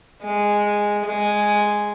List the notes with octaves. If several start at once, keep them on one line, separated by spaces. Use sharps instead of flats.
G#3
G#3